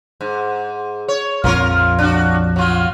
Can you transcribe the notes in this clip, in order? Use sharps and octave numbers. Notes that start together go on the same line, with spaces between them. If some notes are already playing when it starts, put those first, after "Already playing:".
G#2
C#5
A#1 F2 F3 F4 A#4 C#5
D4 F#4
F#3 F4